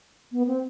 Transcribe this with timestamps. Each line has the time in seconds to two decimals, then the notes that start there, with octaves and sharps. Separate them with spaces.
0.32 B3
0.47 C4